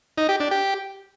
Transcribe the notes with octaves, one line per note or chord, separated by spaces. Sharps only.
D#4
G4
D4
G4